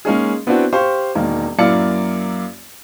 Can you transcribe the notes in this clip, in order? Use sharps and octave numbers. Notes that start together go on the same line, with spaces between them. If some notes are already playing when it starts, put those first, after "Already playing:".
G#3 A#3 C#4 D#4 G#4
B3 C4 D4 E4 F#4
G4 C5 F5 C#6
E1 D#3 A#3
F#2 A#3 E4 D5 F5 C#7